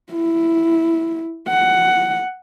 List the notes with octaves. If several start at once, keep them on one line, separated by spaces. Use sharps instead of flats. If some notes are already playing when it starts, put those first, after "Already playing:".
E4
F#5